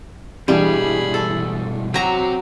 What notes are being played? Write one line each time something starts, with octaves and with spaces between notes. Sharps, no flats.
G2 B2 E3 G3 G#3 D4 G#4 B5
A4
F#3 C4 F#4 G4 A#5